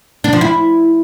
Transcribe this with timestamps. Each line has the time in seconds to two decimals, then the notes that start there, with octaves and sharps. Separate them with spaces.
0.24 D4
0.33 F3
0.41 E4